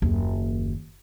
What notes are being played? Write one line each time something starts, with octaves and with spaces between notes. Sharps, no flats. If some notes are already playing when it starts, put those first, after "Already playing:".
F#1 D#2